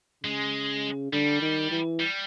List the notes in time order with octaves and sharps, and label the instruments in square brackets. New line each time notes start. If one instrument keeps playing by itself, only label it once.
[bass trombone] C#3 [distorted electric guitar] G#3
[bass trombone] D3 [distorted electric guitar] G3
[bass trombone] D#3
E3
[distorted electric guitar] G3